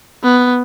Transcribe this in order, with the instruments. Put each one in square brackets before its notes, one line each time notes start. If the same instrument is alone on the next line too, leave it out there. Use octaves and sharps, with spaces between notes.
[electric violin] B3